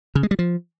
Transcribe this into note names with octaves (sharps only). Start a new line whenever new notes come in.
C#3
G#3
G3
F3